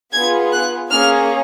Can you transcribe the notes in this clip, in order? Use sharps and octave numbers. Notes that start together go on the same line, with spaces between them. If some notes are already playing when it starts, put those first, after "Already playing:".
B3 F4 G#4 G#6
F#6
A#3 C#4 G#4 F6